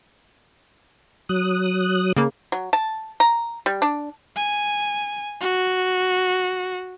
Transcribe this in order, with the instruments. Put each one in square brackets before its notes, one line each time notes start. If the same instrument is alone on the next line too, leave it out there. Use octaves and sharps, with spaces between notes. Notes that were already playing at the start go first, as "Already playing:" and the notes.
[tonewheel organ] F#3 D#6 F#6
[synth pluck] C#3 A#3
[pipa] F#3
A5
A#5
G3
D4
[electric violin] G#5
F#4